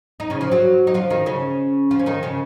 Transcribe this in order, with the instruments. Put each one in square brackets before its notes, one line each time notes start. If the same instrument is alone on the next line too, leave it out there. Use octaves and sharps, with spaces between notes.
[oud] D#4
C#3 C#4
F3 F4
F#3 F#4
D#4
F3 F4
D#3 D#4
C#3 C#4
F3 F4
C#4
D#3 D#4
C#3 C#4